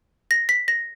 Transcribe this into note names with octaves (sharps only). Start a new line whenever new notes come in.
A#6
B6
A#6